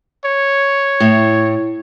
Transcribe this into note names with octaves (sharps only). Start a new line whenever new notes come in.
C#5
A2